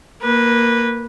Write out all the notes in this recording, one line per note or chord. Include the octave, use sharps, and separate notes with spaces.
A#3 B4